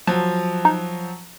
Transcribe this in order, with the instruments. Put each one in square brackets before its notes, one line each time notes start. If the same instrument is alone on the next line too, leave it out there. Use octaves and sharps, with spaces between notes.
[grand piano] F3 F#3 [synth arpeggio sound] A5
[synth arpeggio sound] D#4